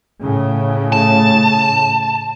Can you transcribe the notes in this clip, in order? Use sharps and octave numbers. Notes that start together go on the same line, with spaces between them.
A2 C#3
A5